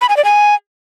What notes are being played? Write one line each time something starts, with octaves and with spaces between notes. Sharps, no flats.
B5
G#5
D5
G#5